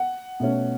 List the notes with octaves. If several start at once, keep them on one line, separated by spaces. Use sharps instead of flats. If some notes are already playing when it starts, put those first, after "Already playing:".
Already playing: F#5
B2 A3 C#4